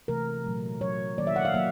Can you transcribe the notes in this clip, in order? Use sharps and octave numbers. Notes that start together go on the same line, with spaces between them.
C3 E3 A3 A#4
A#2 F#3 A3
A#2 F#3 A3 C#5
D#3 F#3 A#3 D5
E5
F#5
F5
F#3 A#3 E5